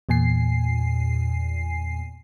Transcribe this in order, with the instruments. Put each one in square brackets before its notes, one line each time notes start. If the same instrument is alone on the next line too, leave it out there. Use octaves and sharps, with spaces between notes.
[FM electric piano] E2 A#2 G#5 C7